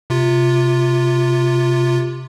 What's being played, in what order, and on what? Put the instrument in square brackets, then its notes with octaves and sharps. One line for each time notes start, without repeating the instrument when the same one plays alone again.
[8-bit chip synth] C3 F4